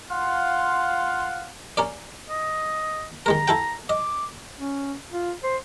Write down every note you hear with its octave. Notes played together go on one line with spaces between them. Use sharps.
F4 F5 F#5 C6
C#4 A#4 D5
D#5
D#3 G#3 A#4 A#5
E4 A4 G5
D#5 D6
C#4
F4
C5